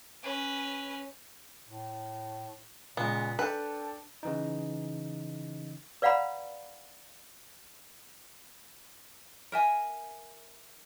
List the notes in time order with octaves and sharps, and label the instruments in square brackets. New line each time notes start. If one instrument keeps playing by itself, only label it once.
[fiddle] C#4 B4
[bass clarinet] A2
[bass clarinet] A#2 [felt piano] C#3 G#3 [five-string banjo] B3
[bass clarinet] D4 [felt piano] A4 G5 A5 [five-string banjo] B4
[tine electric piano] C#3 E3 D#4
[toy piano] B4 D5 F5 F#5 A#5 B5
[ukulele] A#4 E5 G#5